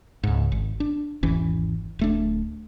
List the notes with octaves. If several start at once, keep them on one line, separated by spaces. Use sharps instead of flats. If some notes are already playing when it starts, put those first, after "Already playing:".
C#2 G#2
G#1
D4
G#1 E2 E3 C#4
D1 A3 D4